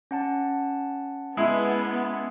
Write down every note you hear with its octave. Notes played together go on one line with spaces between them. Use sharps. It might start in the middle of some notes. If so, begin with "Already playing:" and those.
C#4 F#5 A5
G#3 B3 E4